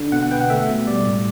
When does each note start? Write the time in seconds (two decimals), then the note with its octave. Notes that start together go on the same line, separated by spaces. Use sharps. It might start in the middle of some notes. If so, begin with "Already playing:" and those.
Already playing: D3
0.12 B2 F#5
0.23 F#5
0.31 B3 G5
0.41 F#5
0.50 A3 E5
0.69 B2
0.87 G3 D5
1.06 A2